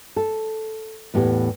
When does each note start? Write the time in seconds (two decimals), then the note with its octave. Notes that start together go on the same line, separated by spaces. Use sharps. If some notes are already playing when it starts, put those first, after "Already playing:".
0.16 A4
1.14 E2 A2 B3 G4